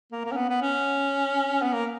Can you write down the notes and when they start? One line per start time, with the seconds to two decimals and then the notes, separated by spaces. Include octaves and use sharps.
0.12 A#3
0.25 A#3
0.32 C#4
0.36 B3
0.50 B3
0.61 C#4
1.62 B3
1.73 A#3